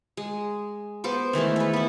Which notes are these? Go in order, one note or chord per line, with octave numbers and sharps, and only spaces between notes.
G#3
B3 C5 D6
D#3 E3 G#3 A3
A4 B4
B3 E4